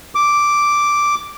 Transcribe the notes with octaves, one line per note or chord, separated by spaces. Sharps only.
D6